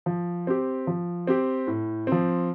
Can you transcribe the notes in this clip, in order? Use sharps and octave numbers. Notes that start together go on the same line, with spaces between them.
F3
C4 G4
F3
C4 G4
A2
F3 C4